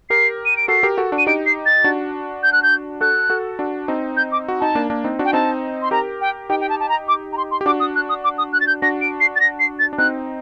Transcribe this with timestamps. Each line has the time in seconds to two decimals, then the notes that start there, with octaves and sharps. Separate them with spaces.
0.10 G4 A#4 C7
0.45 D#7
0.57 D7
0.68 F#4 A4 C7
0.83 G4 A#4
0.98 F#4 A4
1.12 D4 F#4
1.18 D#7
1.27 D#4 G4 D7
1.46 C7
1.66 A6
1.84 D4 F#4
2.43 G6
2.52 F#6
2.63 G6
3.01 F#4 A4 F#6
3.30 F#4 A4
3.59 D4 F#4
3.88 C4 D#4
4.17 G6
4.32 D6
4.48 F#4
4.60 D#4 A5
4.75 A#3 D4
4.90 A#3 D4
5.04 C4 D#4
5.19 D4 F#4
5.25 G5
5.33 C4 D#4 A5
5.82 C6
5.91 G4 A#4 A#5
6.21 G5
6.49 D#4 G4 G5
6.60 G5
6.69 A5
6.80 A5
6.89 A#5
7.08 D6
7.32 A#5
7.37 C6
7.51 C6
7.61 G4
7.66 D4 F#4 D6
7.80 D#6
7.96 F#6
8.09 D#6
8.24 D6
8.38 D#6
8.53 F#6
8.61 A6
8.67 G6
8.82 D4 F#4 A#6
9.01 D7
9.20 C7
9.36 A6
9.40 A#6
9.59 C7
9.79 A6
9.93 D4
9.98 C4 D#4 F#6